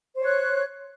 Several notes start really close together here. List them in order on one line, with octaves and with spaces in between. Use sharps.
C5 C#5 F#6